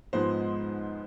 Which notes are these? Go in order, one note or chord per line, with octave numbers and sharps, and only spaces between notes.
G#2 F3 G#3 B3 C5